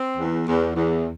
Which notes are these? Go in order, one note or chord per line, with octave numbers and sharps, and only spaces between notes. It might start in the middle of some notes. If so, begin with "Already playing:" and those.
Already playing: C4
E2
E2
E2